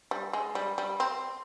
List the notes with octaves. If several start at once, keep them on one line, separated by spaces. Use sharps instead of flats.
G3
G#3
G3
G3
C4